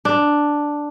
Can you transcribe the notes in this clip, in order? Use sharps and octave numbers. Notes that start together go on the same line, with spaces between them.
D4